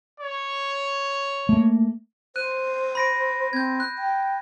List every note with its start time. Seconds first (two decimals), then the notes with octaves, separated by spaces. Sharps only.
0.20 C#5
1.49 A3 A#3
2.36 C5 F#6 D#7
2.95 B5 A#6 D7
3.53 C4 G6 G#6
3.80 F#6
3.98 G5